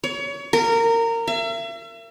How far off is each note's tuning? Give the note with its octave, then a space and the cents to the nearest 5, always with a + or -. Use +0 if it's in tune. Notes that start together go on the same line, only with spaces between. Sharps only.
C#5 +30
A#4 -20
E5 +40